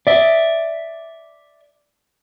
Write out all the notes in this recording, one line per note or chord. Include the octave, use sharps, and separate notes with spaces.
D5 E5